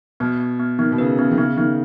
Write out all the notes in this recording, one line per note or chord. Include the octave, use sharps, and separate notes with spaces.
B2 B3
B3
B3
D#3 B3
B2
C#3 B4
C#3 B3
D#3
C#3 B3
D#3 B3